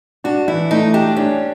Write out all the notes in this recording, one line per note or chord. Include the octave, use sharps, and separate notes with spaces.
D4 F#4
E3 E4
A3 D#4
D4 G4
C#4 D4